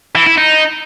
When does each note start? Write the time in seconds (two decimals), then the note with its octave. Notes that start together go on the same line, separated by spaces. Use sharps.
0.16 E3
0.27 E4
0.38 D#4